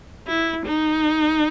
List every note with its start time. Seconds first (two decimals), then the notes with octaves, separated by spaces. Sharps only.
0.26 E4
0.66 D#4